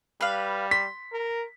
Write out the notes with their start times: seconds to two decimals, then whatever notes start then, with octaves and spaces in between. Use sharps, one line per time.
0.21 G3 B4 F5
0.71 C6 B6
1.12 A#4